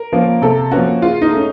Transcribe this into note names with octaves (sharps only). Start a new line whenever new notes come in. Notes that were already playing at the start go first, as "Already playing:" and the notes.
Already playing: A#4
F3 A#3 C#4
C3 A4
F3 A#3 C#4 F#4
C#3 F4
D#4
A3 C#4